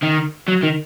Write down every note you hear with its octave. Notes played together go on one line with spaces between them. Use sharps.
D#3
F#3
D#3